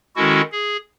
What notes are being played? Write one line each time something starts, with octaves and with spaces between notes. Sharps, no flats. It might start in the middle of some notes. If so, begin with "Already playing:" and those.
D#3 G#3 C#4 E4 F#4 A4
G#4